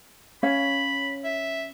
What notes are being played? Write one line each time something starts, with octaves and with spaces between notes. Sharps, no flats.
C#4 C#5 F5 B5
E5